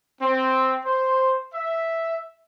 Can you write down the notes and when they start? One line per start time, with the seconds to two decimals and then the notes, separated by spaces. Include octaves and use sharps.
0.20 C4
0.85 C5
1.53 E5